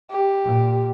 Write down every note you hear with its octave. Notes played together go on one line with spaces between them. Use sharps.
G4
A#2